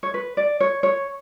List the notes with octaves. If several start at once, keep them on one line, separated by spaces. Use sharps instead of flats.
C#5
B4
D5
C#5
C#5